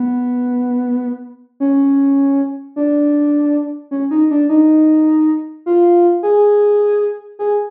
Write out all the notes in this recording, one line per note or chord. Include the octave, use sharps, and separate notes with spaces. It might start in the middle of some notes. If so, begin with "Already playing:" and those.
Already playing: B3
C#4
D4
C#4
D#4
D4
D#4
F4
G#4
G#4